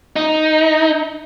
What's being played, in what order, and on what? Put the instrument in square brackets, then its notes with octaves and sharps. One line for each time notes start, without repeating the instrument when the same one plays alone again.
[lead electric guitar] D#4